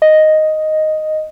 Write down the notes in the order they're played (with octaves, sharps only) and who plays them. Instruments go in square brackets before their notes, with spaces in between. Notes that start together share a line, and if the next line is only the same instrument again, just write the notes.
[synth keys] D#5